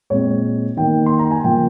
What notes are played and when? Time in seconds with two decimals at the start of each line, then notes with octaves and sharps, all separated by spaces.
0.10 A#2 G#3 C4 C#5
0.77 D#3 A#3 G5
1.06 C6
1.19 A#5
1.31 G#5
1.44 C#3 F3 A#3 G5